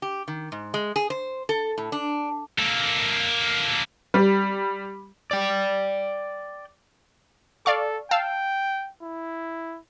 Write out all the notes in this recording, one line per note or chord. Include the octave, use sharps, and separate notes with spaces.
G4
D#3
G#2
G#3
G#4
C5
A4
A2
D4
A#3 A4
G3
D5 G5
A4 D5 F5 C#6
F5 G5 A5 E6
E4